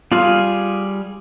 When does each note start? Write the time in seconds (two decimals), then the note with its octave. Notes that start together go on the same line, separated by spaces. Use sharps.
0.12 G3 F4 G#4 F6